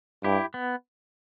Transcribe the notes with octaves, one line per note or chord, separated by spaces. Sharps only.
G2 E4 G4
B3